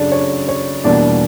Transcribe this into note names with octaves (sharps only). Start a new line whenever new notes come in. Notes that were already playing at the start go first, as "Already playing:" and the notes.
Already playing: F#2 C#3 F#3 A3 D4 D5
C#5
C#5
E2 B2 G3 A#3 D4 D5